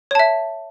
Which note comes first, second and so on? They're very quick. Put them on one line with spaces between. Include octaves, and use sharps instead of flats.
C#5 A5 E5